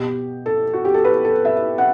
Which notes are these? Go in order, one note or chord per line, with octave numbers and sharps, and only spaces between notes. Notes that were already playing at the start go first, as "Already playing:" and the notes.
Already playing: B2 G4
A4
F#4
G4
A4
B4
A4
E5
F#5